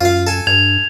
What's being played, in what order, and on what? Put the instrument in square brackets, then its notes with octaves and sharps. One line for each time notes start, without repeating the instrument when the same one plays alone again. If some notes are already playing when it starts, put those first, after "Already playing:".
[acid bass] F#2 [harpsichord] F4 F5
[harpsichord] A4 G#5
[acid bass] G2 [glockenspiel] G#6 F7